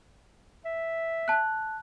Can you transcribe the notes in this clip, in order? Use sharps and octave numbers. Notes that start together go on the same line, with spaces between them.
E5
A5 F#6